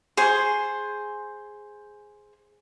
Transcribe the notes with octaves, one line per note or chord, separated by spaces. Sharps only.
G#4 C5 C#6